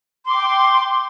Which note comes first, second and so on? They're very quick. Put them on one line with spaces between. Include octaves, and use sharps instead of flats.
C6 D6 G5